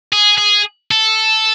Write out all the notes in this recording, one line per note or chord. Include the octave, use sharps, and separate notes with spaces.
G#4
G#4
A4